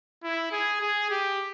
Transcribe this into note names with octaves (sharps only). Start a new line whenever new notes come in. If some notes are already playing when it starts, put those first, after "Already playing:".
E4
G#4
G#4
G4